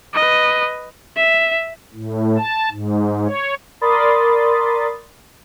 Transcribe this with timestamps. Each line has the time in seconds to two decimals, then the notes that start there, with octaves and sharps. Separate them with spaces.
0.14 B4 D#5
1.16 E5
1.94 A2
2.37 A5
2.72 G#2
3.27 C#5
3.81 A#4 D5 B5 C6 D#6 A6